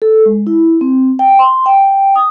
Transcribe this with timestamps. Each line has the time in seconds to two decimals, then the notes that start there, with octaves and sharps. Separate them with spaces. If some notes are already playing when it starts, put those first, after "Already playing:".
0.02 A4
0.26 G#3
0.47 E4
0.81 C4
1.19 G5
1.39 C6
1.66 G5
2.16 D#6